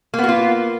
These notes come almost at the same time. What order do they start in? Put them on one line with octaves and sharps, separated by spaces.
A#3 B3 F#4 F4